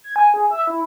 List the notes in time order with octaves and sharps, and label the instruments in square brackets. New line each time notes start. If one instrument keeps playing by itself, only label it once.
[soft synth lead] G#6
G#5
G#4
E5
E4